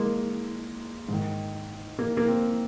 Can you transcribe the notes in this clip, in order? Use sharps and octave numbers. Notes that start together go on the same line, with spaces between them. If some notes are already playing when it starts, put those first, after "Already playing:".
Already playing: G#3 A#3
G#2 D#3
A#3
A#3
C4